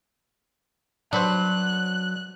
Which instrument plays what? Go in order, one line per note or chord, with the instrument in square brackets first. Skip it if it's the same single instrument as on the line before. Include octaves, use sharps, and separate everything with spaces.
[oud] F#3 [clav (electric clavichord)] D4 B4 C5 [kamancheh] F#6